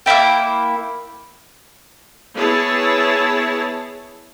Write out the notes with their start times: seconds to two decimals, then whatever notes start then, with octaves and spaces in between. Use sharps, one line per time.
0.06 A#3 C4 E4 G5
2.36 B3 E4 G#4 C#5 A5